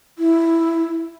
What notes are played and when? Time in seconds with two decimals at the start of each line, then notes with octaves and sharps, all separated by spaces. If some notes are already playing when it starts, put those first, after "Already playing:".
0.19 E4